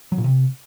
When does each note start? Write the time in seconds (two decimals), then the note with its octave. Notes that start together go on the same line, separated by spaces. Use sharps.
0.12 F#3
0.18 A#2
0.24 C3